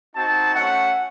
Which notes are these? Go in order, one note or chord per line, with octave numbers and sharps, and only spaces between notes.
C4 D#4 F#4 A5
A3 C#4 F#4 F#5